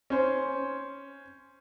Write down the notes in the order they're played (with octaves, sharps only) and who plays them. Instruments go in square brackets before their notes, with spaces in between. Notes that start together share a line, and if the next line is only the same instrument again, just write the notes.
[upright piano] C#4 C5